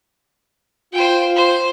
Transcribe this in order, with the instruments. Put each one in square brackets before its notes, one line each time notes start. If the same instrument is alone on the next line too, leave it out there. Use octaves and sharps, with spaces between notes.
[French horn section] F4 [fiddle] C5 G5
[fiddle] C5